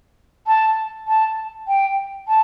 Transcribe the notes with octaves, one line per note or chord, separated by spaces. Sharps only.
A5
A5
G5
A5